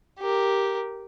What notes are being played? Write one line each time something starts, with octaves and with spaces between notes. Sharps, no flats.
G4 A#4